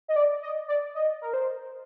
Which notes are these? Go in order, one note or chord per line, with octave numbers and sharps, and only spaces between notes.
D#5
D5
D#5
D5
D#5
A#4
C5